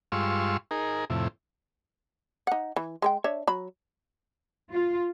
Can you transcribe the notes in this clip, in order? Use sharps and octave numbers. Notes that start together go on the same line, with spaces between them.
G2 G#3 F4 C6 C#6 E6
D#4 G#4 A#4
F2 A2 C3 E4
D#4 F#5
E3
G#3 B4 G5
D4 C#5 E5
F#3 B5
F4